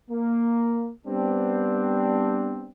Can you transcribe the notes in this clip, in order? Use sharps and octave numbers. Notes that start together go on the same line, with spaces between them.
A#3
G3 B3 C4 D4